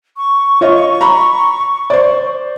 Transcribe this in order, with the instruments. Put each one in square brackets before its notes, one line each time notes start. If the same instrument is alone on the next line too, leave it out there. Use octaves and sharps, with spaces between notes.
[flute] C#6
[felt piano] F4 C#5 D#5
A#5 B5
C5 D5